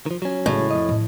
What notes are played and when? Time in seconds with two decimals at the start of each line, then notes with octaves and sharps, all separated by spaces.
0.06 D#3 F3
0.22 F#3 C#4
0.46 A2 C#3 G#3
0.71 F2 D#5
0.89 A2 F3